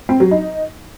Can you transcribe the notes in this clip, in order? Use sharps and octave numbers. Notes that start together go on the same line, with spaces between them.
C4
F#3
D#4